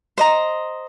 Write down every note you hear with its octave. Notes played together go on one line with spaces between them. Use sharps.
C5 D#5 A#5